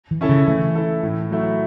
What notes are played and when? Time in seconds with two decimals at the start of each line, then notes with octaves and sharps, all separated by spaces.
0.11 E3
0.21 C#4 E4 A4
0.29 C#3
0.47 E3 A3
0.75 E4 A4
1.03 A2
1.31 F#3 A3 E4